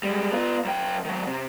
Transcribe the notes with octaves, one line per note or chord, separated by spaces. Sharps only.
G3 G#3
B3 F4
F#2 G5
D#3 F#3
C3